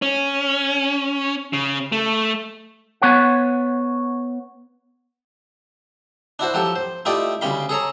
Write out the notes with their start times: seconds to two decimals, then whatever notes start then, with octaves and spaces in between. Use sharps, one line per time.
0.02 C#4
1.53 C#3
1.92 A3
3.02 B3 C#5 F#5
6.39 D4 E4 F#4 C5
6.54 F3 F#3 G4 A4
6.76 C5
7.05 A3 E4 F4 G4 D5 D#5
7.41 D2 C#3 G3 F5 B5 C6
7.69 G#4 A4 C#5 A#5